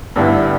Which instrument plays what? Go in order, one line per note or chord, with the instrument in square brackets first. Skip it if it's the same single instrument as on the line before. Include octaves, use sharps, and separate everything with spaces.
[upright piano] G2 D3 G3 B3 E4